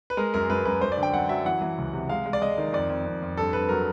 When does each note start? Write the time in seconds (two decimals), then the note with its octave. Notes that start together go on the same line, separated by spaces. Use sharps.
0.10 B4
0.17 G#3 A#4
0.34 F#2 A#4
0.49 F#2 B4
0.65 F#2 B4
0.81 F#2 C5
0.92 D5
0.97 D3
1.03 G5
1.13 F#2 F#5
1.29 F#3 E5
1.45 E3 F#5
1.62 E3
1.78 C#2
1.93 C3
2.09 G#3 F5
2.26 G#3
2.33 D5
2.41 G#3 D#5
2.58 D#3
2.73 F2 D5
2.89 F2
3.06 F2
3.22 F2
3.37 G2 A4
3.53 G2 B4
3.69 F#3 A#4